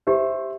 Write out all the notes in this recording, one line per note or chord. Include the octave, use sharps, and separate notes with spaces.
G4 C5 E5